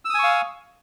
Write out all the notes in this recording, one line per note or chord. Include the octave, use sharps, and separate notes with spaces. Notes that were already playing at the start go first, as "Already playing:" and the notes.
F5 G#5 C#6 D#6 E6